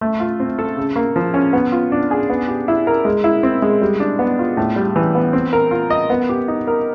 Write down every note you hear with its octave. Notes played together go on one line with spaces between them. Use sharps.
A3
F4
C4
A4
C#3
A#3
F3
C#4
B3
F4
D4
G#4
B3
G4
E4
A#4
G#3
E4
C4
G#3
G3
D4
B3
F4
A2
G3
E3
B3
C4
A#4
F4
D#5
B3
G4
D#4
A#4